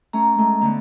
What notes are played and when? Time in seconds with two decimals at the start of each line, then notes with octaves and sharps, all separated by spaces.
0.13 A3 C#4 A#5
0.38 G#3 A3
0.61 D3 A3 B3